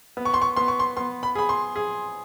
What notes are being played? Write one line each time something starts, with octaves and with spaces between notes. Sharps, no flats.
B3
C#6
C6
C#6
B3 C6
C#6
C6
B3 C6
B5
G#4 B5
C6
G#4